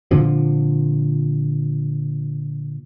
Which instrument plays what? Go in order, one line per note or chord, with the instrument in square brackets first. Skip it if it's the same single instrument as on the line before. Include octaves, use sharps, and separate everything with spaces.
[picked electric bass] A#2 D3 F3